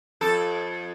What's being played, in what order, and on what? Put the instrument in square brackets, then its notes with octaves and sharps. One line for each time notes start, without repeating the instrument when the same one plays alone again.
[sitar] F2 A4